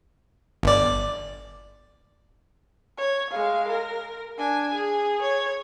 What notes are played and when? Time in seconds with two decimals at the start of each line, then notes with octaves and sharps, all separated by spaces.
0.63 G1 D5
2.98 C#5
3.30 G#3 F5
3.68 A#4
4.38 D4 G#5
4.74 G#4
5.22 C#5